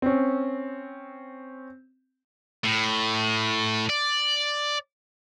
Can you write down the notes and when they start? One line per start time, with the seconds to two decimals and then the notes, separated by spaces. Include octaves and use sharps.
0.02 C4 C#4
2.64 A2
3.89 D5